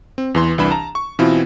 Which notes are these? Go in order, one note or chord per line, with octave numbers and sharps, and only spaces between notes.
C4
E2 E3 C6
C2 E3 D4 B5 E7
A5 A#5
C#6
B2 E3 B3 C4 E4 F4